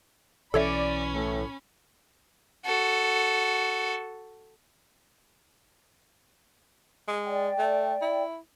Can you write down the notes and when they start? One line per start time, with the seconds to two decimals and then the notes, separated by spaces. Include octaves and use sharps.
0.54 B1 E3 C#4 A4 C#5 D5 E5 B5
1.15 A2
2.66 F#4 A4
7.08 G#3
7.24 D5 G5
7.58 A3
8.02 E4